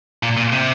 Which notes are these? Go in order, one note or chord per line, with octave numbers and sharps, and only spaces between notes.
A#2
A#2
C3